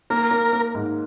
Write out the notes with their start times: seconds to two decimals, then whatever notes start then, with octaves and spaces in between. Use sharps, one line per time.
0.10 A#3 A#4
0.31 A#3
0.53 A#3
0.75 G#2